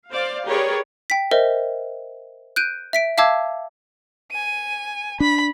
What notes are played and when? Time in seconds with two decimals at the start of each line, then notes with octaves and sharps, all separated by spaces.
0.11 C5 D5 F5
0.46 G4 G#4 A#4 B4 C#5 D5
1.10 G5 B6
1.31 A#4 C5 D#5 E5
2.56 F#6 G6 D7 D#7
2.93 E5 B6 D7
3.18 E5 F5 A5 D6 E6 G#6
4.32 G#5 D#7
5.20 D4 B5